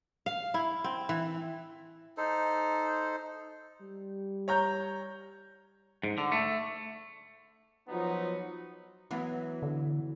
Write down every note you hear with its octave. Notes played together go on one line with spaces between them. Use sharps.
F5
E4
C4
E3
D#4 A4 C5
G3
C#5 A#5 G6
G#2
D3
A3
F3 F#3 B3 D#4
E3 F#3 B3
D3